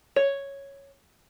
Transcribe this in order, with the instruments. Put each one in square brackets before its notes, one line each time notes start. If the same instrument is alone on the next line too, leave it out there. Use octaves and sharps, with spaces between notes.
[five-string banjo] C#5